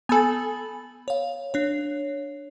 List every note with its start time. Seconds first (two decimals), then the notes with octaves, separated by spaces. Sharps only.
0.09 B3 A4 G#5 B5 F#7
1.08 C#5 F5
1.54 D4 C#5